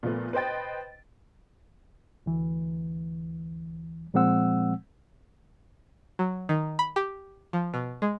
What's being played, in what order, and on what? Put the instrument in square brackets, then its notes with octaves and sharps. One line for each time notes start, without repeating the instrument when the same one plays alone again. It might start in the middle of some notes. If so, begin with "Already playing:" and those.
[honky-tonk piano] A#2 F3 A3 B3
B4 C5 D#5 G5 A6
[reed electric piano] D2 E3
A#2 F3 G#3 C4 F#5 E6
[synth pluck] F#3
D#3
B5
G4
F3
B2
G#3